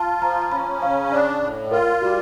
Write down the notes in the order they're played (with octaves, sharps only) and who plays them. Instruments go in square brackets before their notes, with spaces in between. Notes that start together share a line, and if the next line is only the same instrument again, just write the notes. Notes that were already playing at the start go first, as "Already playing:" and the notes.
Already playing: [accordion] F4 [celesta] A5
[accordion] F3 [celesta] A#5
[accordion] C#4 [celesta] B5
[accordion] C#3 [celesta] F5
[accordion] D4 [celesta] D5
[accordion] A2
[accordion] F4 [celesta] A#4
[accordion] G3 [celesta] F#4